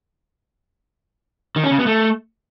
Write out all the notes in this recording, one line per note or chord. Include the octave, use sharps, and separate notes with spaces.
D#3
C#4
C#3
B3
A3